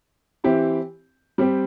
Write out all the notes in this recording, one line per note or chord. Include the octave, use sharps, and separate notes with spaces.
E3 C4 E4 G4
G3 C4 G4